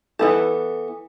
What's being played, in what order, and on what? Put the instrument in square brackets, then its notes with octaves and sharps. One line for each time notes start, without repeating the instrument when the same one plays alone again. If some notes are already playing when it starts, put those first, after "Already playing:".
[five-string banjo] E3 B3 A4